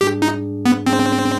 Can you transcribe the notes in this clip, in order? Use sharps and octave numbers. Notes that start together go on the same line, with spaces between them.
G#2 G3 D4 G4 G#4
D#4
B3
G#2 G3 C4 D4 G#4